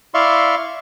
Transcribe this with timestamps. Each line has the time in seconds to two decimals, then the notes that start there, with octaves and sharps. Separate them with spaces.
0.14 E4 D5 E5 F5 C6 C#6